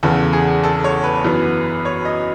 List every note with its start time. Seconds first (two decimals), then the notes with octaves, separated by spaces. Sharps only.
0.03 E2 C#3 E3 A4
0.33 G#4
0.64 A4
0.84 C#5
1.04 B4
1.25 F#2 E3 B3
1.85 C#5
2.05 D#5